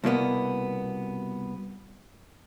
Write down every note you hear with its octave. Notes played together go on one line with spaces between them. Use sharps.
C2 B2 A#3 B3